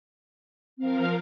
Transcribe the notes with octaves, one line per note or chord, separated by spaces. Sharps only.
F3 C4 A#4 F5